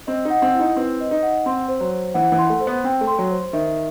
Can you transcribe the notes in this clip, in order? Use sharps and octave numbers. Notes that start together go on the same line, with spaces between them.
C4 D#5
D#4
F#5
C4
E4
D#4
C4 B4
D#5
D#4
F#5
C4 C6
C5
F#3
C5
E3 F#5
E3
C6
A3
C5
B3
C4 G5
A3
C6
F#3
C5
D#3 E5